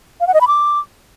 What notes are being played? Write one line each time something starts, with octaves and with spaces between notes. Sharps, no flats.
F5
F#5
D#5
B5
D6